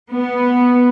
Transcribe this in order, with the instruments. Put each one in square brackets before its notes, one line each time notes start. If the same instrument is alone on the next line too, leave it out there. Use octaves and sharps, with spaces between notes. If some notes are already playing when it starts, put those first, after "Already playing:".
[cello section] B3